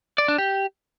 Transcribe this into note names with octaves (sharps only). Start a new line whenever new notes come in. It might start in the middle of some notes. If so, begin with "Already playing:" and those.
D5
D4
G4